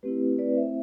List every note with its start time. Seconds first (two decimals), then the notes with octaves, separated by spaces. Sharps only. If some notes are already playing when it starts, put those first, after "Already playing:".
0.03 A3 C4 E4 G4 B4
0.38 B4 D5
0.56 C5 E5